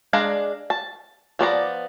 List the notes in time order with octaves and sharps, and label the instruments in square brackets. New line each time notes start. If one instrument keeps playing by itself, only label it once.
[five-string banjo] G#3 D4 F5 A#5
A5
F3 B3 D5 A#5